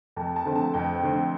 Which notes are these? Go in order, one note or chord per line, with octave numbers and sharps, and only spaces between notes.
F2 A5
A5
D3 A3 C4
A5
F2 G5
D3 A3 C4